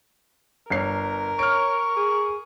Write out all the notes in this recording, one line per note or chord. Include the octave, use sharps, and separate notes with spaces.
G1 A#4 C#5 C7
C#5 C#6 F6 D7
G#4